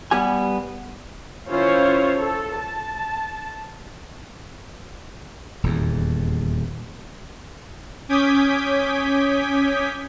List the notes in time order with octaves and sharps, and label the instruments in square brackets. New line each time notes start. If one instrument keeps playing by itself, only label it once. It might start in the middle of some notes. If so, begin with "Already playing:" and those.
[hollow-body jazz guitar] G3 B3 G4 G#5
[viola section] D#3 C#4 E4 F4 C5 C#5
A4
A5
[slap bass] D#1 E2
[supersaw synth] C#4 D6 D#6 G6 G#6 B6